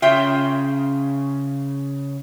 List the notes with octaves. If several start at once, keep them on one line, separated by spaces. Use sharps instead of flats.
C#3 F4 E5 G5